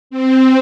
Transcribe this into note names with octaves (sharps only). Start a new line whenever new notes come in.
C4